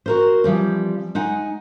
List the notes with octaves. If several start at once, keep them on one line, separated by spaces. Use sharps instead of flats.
F#4 A#4 C5
E3 F3 G3 C4
G#3 D#4 F#5 G#5